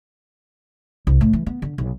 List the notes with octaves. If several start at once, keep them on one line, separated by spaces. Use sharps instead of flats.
C2
A2
E3
B3
D3
B1